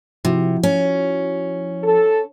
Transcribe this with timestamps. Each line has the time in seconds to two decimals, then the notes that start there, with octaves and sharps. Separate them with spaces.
0.25 C3 F3 E4 F#4
0.63 C#4
1.83 A4